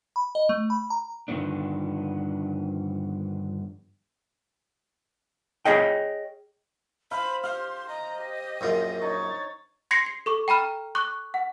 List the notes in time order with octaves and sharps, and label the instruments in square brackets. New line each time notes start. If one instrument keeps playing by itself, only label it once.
[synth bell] B5
D#5
A3
B5
A#5
[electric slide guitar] G2 D3 D#3 F3 B3 D4
[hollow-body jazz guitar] G#4 C#5 D#5 G5
[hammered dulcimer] C5 F5 C6 [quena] B5
[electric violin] G4 [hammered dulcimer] F5 [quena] C6
[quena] D#5 [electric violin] A#5
[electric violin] G4
[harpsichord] A#1 F#2 F4
[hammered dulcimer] D#4 [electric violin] C#5 A6
[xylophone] C6 G#6 A#6 C7 C#7
C7
A4 C#6 D6
G5 A#5 B5 F6
C#6 D6 F#6
F#5